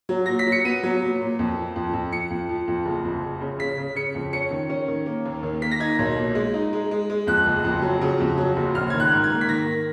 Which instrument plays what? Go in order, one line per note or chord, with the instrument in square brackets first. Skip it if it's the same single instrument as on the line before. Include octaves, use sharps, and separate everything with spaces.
[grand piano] F#3
A#2 A#6
B6
F#3
C#7
B3 D#7
F#3
A#2
A#2
F2
F3
F2
F2
F3 C#7
F2
F3
F2
F#1
F2
F#1
C#3
C#3 B6
C#3
C#3 C#7
F2
C#4 C#7
D#3
C#4
D#3
A#3
D#2
D#3
A#3 B6
A#6
D#4 G#6
B1
A#2
G#3
D#4
G#3
G#3
G#3
F2 F#6
F#1
F2
F#3
C#3
F2
F#3
F#1
A#1 F6
D#3 G#6
F#6
G#2
G#6
A#3
B6
D#3 A#6
D#3